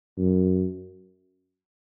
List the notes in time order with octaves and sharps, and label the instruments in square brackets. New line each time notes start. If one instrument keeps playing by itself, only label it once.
[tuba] F#2